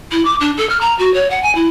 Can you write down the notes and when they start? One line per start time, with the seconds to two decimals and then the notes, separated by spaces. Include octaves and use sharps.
0.11 E4
0.25 D6
0.40 D4
0.57 A4
0.69 F6
0.80 A#5
0.98 F#4
1.13 C#5
1.30 F#5
1.43 G#5
1.55 E4